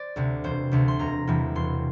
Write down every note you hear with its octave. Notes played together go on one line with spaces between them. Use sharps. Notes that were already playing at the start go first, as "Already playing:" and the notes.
Already playing: C5 D5
D2 C3
E1 C5
D2 C3
C6
E1 A#5
E2 C3 E3 G3
E1 C6